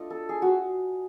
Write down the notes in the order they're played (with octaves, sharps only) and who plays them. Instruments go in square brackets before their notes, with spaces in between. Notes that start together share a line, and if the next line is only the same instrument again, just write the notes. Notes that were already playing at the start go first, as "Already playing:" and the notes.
Already playing: [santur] A3 D4 F4 D#5
A4
G#4
F#4